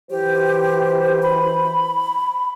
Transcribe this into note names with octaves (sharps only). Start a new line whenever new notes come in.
E3 F#3 G4 C5
B5